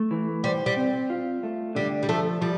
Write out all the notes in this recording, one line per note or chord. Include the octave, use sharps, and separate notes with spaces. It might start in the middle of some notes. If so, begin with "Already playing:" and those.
Already playing: A3
E3
G3 C5
G3
C4
F4
A3
D3 G3
G3
F3 A3
F3 G3